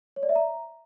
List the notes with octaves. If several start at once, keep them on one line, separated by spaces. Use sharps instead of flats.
C#5
D5
E5
A#5